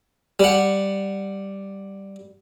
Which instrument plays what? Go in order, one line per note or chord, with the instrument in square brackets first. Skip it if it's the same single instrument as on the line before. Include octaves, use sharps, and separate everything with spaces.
[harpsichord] G3 F#5